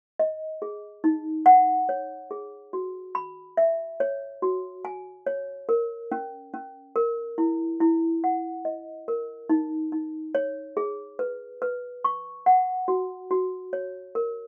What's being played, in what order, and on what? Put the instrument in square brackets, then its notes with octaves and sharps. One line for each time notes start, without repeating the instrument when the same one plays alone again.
[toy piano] D#5
G#4
D#4
F#5
C#5
G#4
F#4
B5
E5
C#5
F#4
G#5
C#5
A#4
C#4
C#4
A#4
E4
E4
F#5
D#5
A#4
D#4
D#4
C#5
G#4
B4
B4
C#6
F#5
F#4
F#4
C#5
A#4